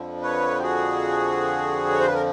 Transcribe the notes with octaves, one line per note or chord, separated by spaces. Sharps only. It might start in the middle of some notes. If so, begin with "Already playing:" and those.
Already playing: F2 D3 F3
B4 C#5
G4
F#4 G#4
C#5
C5
B4
A#4